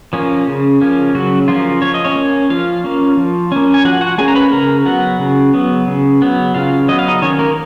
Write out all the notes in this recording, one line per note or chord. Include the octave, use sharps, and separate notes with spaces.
F3 A#3 C#4
C#3
F3 A#3 C#4
C#3 F#3 F#4
F3 A#3 C#4 F4
F3 C#5
D#5
C#4 C#5
A#3 C#4
F3 F4 F5
A#3 C#4
F3
A#3 C#4
G#5
F3 F#4 F#5
F#4 F#5
A#3 C#4 G#4 G#5
A#5
B4 B5
C#3 A#4 A#5
F#3 B3 F#4 F#5
C#3
F#3 B3
C#3
F#3 B3
C#3 F4 F5
F#3 B3 D#5
F5
D#4 D#5
D#3 C#4 C#5
A#3 A#4